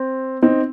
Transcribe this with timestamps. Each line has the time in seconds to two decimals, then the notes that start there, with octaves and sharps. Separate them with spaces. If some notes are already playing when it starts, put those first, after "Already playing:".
Already playing: C4
0.43 C4 D#4